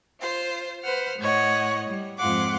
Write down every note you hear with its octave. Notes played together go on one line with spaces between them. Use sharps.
F4 C5
B4 C5 F#5 F6
A2 C#5 D#5 F#5
G3
F2 G#2 F4 F#5 C6 D6